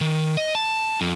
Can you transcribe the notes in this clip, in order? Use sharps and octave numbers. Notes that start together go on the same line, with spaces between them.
D#3
D#5
A5
F2